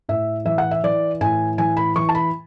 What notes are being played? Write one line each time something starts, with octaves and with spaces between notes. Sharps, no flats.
A2 E5
E3 E5
F#5
E5
E3 D5
A2 G#5
E3 G#5
B5
E3 C#6
A5
B5